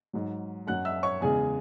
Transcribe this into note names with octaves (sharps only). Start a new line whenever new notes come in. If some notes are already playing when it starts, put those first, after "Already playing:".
G#2 F#3
F#2 F#3 F#5 F#6
E5 E6
C#5 C#6
E2 C#3 G#3 G#4 G#5